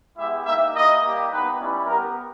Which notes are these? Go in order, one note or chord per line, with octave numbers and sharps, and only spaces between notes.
G#3 B3 E4 G4 E5
A#3 D#4 G4 E5
A#3 E4 G4 D#5
G3 A#3 E4 G4
B3 D#4 G4 B4
G3 C#4 E4
B3 G4 A#4